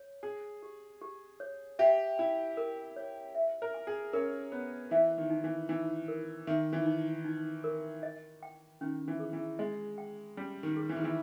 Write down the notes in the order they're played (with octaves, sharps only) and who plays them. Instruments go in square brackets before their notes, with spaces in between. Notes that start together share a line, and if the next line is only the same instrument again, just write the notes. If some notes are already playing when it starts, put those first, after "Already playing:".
Already playing: [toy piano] C#5
[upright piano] G#4 [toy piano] G#5
[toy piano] G4
G4
C#5
[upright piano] G4 [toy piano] E5
[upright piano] E4 [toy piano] G#5
[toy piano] A#4
C#5
E5
[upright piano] A#4
[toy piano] G#5
[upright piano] G#4
[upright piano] C#4 [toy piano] A#4
[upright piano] B3 [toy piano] C#5
[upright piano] E3 [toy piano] E5
[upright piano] D#3
[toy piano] D#4
[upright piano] E3
[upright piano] E3 [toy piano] D#4
[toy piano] A#4
[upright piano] D#3 [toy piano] E5
[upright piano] E3
[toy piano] D#4
D#4
A#4
D#5
G5
[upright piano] D#3 [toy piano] C#4
[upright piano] E3
[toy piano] G#4
[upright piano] E3
[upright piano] G#3 [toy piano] D#5
[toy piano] G5
[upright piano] G3 [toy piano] C#4
[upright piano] D#3
[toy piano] G#4
[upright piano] E3
D#3
E3